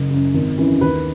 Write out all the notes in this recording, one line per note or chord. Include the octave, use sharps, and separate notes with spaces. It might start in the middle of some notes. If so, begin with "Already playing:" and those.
Already playing: F#1
F#2 C#3
G#1
F#2 C#3 E3
D#2 B4